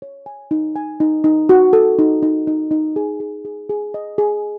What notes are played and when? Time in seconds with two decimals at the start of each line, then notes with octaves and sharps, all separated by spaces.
0.02 C#5
0.26 G#5
0.51 D#4
0.76 G#5
1.00 D#4
1.24 D#4
1.49 F#4
1.73 A4
1.99 D#4
2.23 D#4
2.47 D#4
2.71 D#4
2.96 G#4
3.20 G#4
3.45 G#4
3.70 G#4
3.94 D#5
4.18 G#4